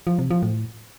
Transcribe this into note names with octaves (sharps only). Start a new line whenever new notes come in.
F3
C3
F3
A2